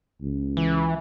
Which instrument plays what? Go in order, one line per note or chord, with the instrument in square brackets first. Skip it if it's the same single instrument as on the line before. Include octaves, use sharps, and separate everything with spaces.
[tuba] C#2
[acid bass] E3